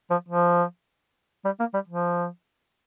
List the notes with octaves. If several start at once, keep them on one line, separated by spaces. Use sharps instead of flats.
F3
F3
G3
A#3
G3
F3